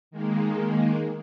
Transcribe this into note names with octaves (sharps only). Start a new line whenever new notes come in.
D#3 G#3 A#3